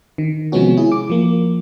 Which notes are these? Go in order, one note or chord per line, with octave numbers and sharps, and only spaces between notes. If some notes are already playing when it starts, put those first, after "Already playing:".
D#3
C3 F3 G#3 B3 C#4 F#4
E4 G#4
D6
F3 A#3